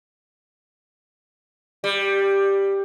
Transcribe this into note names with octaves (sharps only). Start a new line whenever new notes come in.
G3